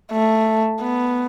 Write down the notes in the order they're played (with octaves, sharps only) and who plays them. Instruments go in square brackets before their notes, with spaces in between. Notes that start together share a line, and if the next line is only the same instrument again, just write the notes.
[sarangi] A3
B3